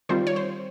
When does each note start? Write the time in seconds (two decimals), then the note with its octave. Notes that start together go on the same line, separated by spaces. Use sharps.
0.09 D#3 G3 C4 F4 C5
0.27 C#5
0.36 C5